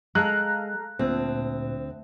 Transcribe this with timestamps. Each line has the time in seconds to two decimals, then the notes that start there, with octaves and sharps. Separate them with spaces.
0.15 G#3 A4 F5 A#5 F#6
0.99 D2 A#2 C4